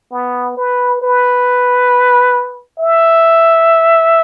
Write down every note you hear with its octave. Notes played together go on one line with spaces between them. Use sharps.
B3
B4
B4
E5